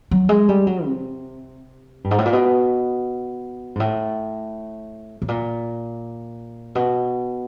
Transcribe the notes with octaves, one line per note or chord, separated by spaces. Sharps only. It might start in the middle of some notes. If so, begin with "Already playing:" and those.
F#3
G#3
G3
F#3
C3
G2
G#2
A2
A#2
B2
G#2
A2
A2
A#2
B2